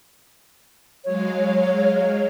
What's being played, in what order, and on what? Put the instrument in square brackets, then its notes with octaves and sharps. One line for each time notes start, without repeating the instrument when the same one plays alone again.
[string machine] F#3 G#3 F5 [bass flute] C#5